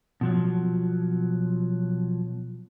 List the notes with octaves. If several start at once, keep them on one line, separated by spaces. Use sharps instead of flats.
B2 F3 F#3